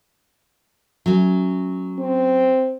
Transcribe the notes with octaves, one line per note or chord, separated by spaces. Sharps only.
F#3 A3 C#4
C4